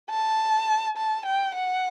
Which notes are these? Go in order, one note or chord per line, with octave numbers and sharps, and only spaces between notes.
A5
A5
G5
F#5